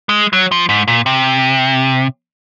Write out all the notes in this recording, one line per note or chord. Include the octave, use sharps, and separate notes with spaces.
G#3
F#3
F3
G#2
A#2
C3